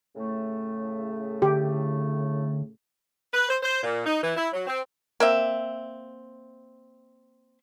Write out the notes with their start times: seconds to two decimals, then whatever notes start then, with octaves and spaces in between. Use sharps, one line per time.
0.16 A2 C#3 A3
1.42 D3 G4
3.33 B4
3.49 C5
3.63 C5
3.83 A#2
4.06 D#4
4.22 E3
4.36 E4
4.53 F#3
4.67 C4
5.20 A#3 C4 E5